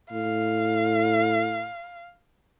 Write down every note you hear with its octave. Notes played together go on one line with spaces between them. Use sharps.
A2 F5